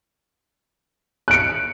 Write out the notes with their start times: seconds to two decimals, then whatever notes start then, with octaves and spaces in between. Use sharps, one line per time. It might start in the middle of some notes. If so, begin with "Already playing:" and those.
1.28 F#6
1.31 D7
1.34 C#7